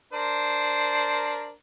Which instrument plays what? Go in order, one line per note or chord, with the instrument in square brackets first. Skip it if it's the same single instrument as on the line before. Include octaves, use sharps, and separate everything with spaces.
[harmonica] D4 A#4 C5